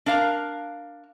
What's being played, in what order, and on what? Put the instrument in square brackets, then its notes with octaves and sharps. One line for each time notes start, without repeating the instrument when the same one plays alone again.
[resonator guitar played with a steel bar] D4 A#4 F5 A#5